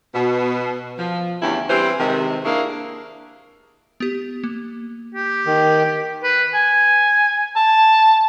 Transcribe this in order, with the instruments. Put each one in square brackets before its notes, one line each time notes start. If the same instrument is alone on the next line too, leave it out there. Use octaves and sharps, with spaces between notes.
[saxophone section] B2
F3
E2 D3 A3 C#4 E4 G4
E3 G3 C4 C5
C3 D#3 G#3
A#3 D4 E4 G#4 C#5
[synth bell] B3 G4
A#3
[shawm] G4
[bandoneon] D#3
[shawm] B4
G#5
A5